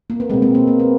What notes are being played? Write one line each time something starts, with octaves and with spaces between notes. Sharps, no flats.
A#3
B3
B2 G#3 A#3 C4
A#3 C4
A#3
A#3
B3